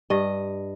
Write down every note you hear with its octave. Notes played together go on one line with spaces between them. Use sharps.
G2 D#5